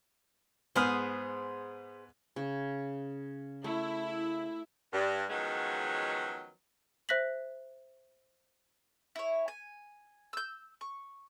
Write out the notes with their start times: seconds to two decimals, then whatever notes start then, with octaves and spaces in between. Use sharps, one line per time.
0.76 G#2 B3 G#4 C5 F6
2.36 C#3
3.64 A3 E4
4.93 G2
5.29 D#3 F3 F#3 G#3 B3 C#4
7.09 C5 E5 F#6 A#6 B6 F#7
9.16 E4 C#5
9.48 G#5
10.33 E6 G6
10.81 C#6